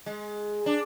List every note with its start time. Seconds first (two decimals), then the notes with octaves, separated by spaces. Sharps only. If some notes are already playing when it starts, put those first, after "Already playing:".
0.06 G#3
0.66 D4